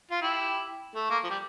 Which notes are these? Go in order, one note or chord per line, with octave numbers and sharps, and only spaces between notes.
F4
E4 G4
A3
A#3
F3
G3